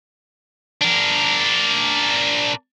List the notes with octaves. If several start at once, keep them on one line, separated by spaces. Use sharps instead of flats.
D4 A#4